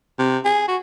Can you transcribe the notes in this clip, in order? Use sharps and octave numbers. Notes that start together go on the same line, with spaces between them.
C3
G#4
F#4